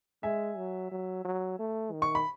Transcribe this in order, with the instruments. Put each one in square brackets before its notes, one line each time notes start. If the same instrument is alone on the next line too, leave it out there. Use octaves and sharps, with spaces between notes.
[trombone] G#3 [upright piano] E5 G#5
[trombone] F#3
F#3
F#3
A3
D#3
[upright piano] C#6
B5